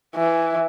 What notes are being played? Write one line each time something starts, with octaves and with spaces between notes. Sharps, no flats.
E3